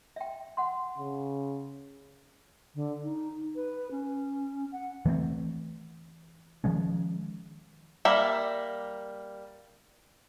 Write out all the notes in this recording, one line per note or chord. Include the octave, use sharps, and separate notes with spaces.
E5 G5
F#5 C6
C#3
D3
D#4
B4
C#4
F#5
E3 A3 A#3 C4
D#3 F3 G#3 C#4
G3 A#3 E5